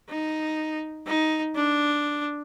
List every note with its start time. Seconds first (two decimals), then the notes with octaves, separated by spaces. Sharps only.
0.10 D#4
1.07 D#4
1.56 D4